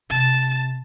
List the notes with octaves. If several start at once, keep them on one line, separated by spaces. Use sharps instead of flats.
C3 A5